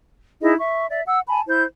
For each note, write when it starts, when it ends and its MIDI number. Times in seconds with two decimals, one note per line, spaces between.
0.41 0.54 63
0.41 0.54 64
0.41 0.54 68
0.41 0.54 75
0.59 0.87 76
0.59 0.87 85
0.90 1.01 74
0.90 1.01 76
1.06 1.20 78
1.06 1.20 88
1.28 1.40 80
1.28 1.40 81
1.28 1.40 83
1.48 1.64 64
1.48 1.64 72
1.48 1.64 91